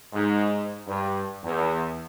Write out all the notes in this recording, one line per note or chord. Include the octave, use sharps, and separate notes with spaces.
G#2
G2
E2